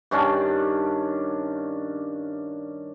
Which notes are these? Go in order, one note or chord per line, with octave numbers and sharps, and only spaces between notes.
G2 D#3 C#4 D4